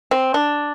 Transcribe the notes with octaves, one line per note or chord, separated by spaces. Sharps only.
C4
D4